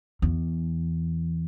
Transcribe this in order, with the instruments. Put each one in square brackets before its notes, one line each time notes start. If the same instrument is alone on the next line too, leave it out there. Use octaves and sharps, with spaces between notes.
[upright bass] E2